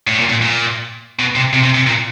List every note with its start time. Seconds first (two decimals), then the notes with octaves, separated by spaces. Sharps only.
0.07 A2
0.19 A#2
0.29 A#2
0.41 A#2
1.19 B2
1.36 C3
1.53 C3
1.63 C3
1.75 C3
1.87 A#2